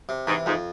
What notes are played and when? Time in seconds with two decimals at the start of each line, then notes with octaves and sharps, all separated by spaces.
0.09 C3
0.27 G#2 E3
0.46 F2 G#2